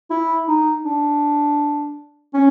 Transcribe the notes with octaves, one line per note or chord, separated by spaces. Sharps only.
E4
D#4
D4
C#4